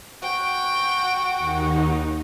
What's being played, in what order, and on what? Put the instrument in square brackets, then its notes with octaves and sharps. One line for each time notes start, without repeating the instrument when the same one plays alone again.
[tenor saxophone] F#4 [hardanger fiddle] G5
[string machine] D#2 D#4